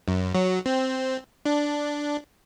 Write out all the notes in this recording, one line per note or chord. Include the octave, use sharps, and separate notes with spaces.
F#2
F#3
C4
D4